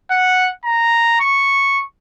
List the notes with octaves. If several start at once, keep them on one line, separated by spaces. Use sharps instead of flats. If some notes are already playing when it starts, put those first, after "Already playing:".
F#5
A#5
C#6